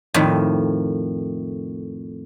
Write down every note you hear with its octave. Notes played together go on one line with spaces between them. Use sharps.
F2 A2 D#3